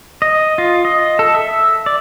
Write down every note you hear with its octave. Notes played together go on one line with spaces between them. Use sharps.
D#5
F4
D#5
A4
E5
D5